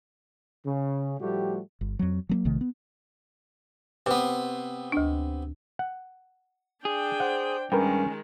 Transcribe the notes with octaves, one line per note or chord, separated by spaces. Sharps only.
C#3
A2 F3 G3 A3 F#4 G4
G1
F2 F#3
F#3 A3 A#3
A#1 C3 D#3 A3
B3
C3 B3 B4 D6
D2 D4
F#5
D4 G#4 G5
C5 F#5
G2 D#3 G#3 C#4 A#4 B4 G5